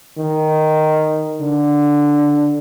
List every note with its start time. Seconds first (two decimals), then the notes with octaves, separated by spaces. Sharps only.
0.18 D#3
1.41 D3